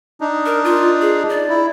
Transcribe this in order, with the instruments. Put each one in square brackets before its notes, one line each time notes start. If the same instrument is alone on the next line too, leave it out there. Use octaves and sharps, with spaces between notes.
[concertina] D4 D#4
[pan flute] A#4
F4
G#4
D5
[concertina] E4